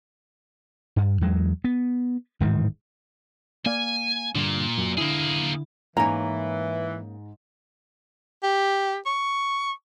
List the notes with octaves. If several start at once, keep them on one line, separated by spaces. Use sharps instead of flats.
G2
E2 F#3 G#3
B3
D1 G#2 D#3 E3
A#3 D5 F5 G#5
G2 A#2 D3
F#2
D3 A#3 E4 G#4
G#2 E3 A#3 C#4 A#5
G4
C#6